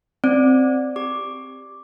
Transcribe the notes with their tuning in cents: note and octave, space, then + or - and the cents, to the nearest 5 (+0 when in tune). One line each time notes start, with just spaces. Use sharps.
C4 +0 D5 +0
G4 +15 D6 +0